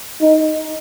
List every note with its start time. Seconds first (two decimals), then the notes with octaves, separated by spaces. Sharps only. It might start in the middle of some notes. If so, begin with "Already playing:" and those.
0.21 D#4